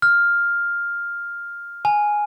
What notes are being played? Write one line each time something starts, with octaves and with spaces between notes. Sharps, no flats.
F6
G#5